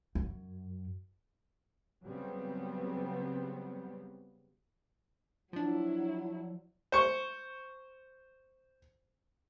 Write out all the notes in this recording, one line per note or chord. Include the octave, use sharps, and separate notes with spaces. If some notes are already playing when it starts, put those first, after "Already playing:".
F#2
C#3 F#3 G3 B3 C4
F3 F#3 D4 E4
C5 C#6